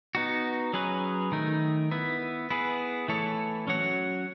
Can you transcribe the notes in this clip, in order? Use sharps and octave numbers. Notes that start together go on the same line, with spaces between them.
B3 D#4 F#4
F#3 C#4 G#4 B4
D#3 A3 D#4
B3 E4 B4
B3 E4 G#4 B4
E3 A3 E4 A4 C#5
F#3 C#4 F#4 C#5